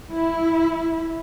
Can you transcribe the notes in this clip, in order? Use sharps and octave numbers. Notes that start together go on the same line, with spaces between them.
E4